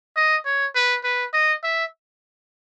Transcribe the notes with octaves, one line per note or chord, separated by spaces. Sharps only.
D#5
C#5
B4
B4
D#5
E5